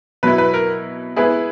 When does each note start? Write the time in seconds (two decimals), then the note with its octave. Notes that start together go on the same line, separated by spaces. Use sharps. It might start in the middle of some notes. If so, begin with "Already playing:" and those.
0.23 B2 F#3 B3 E4 B4
0.38 B4
0.54 A#4
1.16 B3 E4 G#4 B4